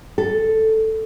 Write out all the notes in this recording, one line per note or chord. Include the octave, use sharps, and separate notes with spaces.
A4